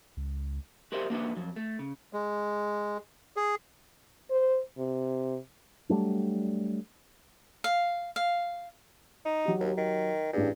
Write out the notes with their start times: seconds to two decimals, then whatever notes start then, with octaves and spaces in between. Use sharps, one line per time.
0.17 C#2
0.92 F#4 G4 A#4 C5 D#5 E5
1.10 A#3 D4 F#4 A#4 B4 E5
1.37 F2 F#3
1.56 A3
1.79 C#3
2.13 G#3
3.37 G#4
4.30 C5
4.78 C3
5.89 F#3 G3 A3 D4
7.64 F5
8.16 F5
9.26 D#4
9.45 F#3 F#4 G4
9.60 D#2
9.78 D#3
10.33 A1 G2 D4 G#4